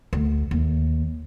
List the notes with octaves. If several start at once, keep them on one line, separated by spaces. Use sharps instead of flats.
D2
D#2